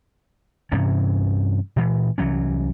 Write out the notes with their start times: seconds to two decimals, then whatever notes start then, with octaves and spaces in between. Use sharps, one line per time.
0.72 G2 C3 E3 C#4
1.76 A#2 E3
2.18 C2 E3 F#3 C#4